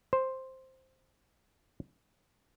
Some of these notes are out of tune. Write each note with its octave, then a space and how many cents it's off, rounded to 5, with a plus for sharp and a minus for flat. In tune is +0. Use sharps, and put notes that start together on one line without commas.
C5 +5